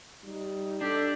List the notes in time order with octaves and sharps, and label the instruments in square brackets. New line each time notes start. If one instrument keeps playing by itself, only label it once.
[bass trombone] G3 [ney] D#4
[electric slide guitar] D4 [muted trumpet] G4 [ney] A4